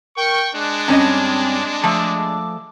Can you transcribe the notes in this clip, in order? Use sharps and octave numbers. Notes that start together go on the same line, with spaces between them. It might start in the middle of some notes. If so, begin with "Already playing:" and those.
A#4 G5 C#6
G#3 D4 F#6
G2 C4 C#4 D#5
F3 A3 D6